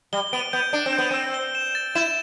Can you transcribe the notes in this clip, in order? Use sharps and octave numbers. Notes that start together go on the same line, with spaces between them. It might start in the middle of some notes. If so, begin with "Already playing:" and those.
G3 G7
B3 D7
B3 G6
D4 D7
C4
G6
B3
C4 E6
G7
E7
A6
E4 E7